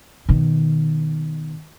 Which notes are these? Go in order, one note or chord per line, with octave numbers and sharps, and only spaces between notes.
B2 D#3